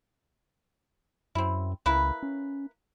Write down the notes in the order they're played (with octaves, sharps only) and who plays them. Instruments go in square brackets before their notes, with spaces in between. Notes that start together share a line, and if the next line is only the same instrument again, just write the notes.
[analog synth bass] F#2 [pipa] C4 E4
[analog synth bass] C#2 [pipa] A#3 E4 B4
[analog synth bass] C#4